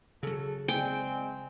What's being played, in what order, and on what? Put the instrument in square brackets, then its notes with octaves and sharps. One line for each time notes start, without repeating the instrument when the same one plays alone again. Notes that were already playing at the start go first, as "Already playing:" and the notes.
[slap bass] C#3 F#3 [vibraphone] G#4 [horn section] A4
[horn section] G#3 C4 [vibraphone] D5 G#5 [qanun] G5